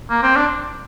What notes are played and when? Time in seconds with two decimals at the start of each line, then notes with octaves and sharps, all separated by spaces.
0.10 A#3
0.23 C4
0.36 D4